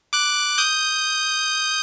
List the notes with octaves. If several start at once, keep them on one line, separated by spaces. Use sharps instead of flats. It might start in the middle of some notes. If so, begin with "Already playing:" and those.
D6 F#6
D#6 G6